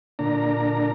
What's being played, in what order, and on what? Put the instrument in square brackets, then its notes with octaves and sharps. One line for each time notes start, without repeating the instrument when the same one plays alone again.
[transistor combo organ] A#2 D3 D4 A#5